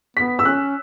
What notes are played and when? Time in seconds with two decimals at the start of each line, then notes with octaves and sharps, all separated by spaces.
0.17 B3 B6
0.39 E6
0.45 C#4 F#6